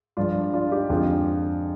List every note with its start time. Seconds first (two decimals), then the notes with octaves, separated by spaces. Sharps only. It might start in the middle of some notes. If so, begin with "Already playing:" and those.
0.17 G2 F3 G#3 D4 F4
0.53 D4 F4
0.72 D#4 G4
0.90 F2 D3 F3 G#3 F4 G#4